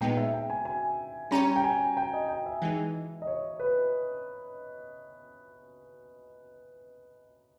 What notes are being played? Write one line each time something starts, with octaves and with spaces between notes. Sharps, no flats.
A#2 G#3 B3 D#4 G5
E5
G5
G#5
G#5
G3 C#4 G4 C#5 A#5
G5
G#5
G5
D#5
G5
E5
E3 G#3 D#4
D#5
C#5
B4